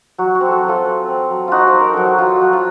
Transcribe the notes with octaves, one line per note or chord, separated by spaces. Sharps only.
F#3 F#4
F#4
C4
F#4 A4
F#3
F4 A4
C4
C4
F#3
D#4 F4 F#4
C5
D#4
A#4
F#3 A4
F#4
F#3 F4
F#4
F#3
F4